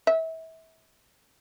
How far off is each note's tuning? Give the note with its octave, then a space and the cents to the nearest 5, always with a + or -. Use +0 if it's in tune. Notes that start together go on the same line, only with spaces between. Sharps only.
E5 -30